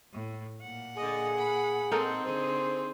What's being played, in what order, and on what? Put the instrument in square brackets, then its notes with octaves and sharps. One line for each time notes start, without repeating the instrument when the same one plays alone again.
[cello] A2
A#2 F#5
[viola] D3 D#5 [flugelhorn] G#4
[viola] B5
[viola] C4 [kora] D#4 A4 A#4
[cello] D3 G#4 [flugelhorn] C5